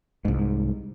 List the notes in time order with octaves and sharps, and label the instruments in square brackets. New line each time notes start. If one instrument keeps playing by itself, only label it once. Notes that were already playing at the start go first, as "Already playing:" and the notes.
[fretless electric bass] C2 G#2